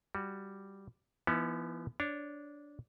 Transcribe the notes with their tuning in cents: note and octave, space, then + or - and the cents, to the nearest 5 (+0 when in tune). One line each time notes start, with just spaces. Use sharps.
G3 +0 F#4 +0
E3 +45 B3 -15 D#4 +45
D4 -10 C#5 +0